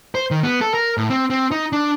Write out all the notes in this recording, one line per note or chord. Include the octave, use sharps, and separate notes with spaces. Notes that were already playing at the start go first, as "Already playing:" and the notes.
C5
D#3
B3
A4
A#4
A2
C4
C4
D#4
D4